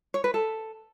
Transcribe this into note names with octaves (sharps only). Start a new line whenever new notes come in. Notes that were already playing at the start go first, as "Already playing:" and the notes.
C#5
B4
A4